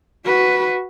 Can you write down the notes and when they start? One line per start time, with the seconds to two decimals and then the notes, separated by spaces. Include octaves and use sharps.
0.25 F#4 B4